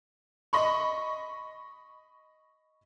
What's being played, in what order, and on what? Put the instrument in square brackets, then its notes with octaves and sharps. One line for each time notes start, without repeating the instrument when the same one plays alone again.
[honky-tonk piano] D#5 B5 C#6